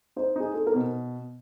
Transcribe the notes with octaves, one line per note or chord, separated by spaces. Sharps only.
D#4 C5
D#4 G#4
D#4 A4
A#4
B2